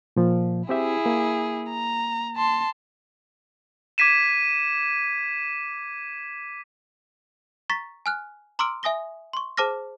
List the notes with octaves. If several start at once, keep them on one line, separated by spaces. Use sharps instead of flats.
A#2 F3
C4 E4 G4 G#4 E5
A#3
A#5
A5 C6
D6 G#6 B6 D#7 E7
A#5 C#6 A6 B6
G#5 F6 F#6
A#5 C6 D6 E6 F6 D7
E5 G#5 D#6 A#6 G7
C6 C#6
G#4 C5 A5 D6 F6 A#6